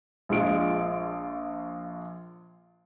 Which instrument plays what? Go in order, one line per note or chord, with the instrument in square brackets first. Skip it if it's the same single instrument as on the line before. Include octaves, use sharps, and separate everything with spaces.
[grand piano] A#1 G#3 F4 D7